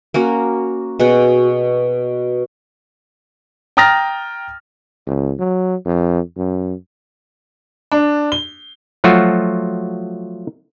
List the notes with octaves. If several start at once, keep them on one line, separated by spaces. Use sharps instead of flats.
A#3 C#4 F#4
B2 G#4 F#5
G5 A#5 D#6 F6 A6 A#6
C#2
F#3
F2
F#2
D4
G7
F3 F#3 A3 F4 F#4